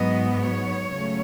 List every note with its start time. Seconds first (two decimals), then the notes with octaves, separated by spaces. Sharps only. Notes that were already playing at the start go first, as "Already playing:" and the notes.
Already playing: G#2 F#3 B3 D#5
0.41 C#5
0.91 C#3 F#3 A3